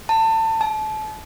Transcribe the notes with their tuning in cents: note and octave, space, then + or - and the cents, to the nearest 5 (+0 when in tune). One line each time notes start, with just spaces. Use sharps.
A5 +25
A5 -30